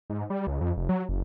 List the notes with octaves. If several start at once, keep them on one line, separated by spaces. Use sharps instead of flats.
G#2
G3
C#2
F2
F1
F#3
F#1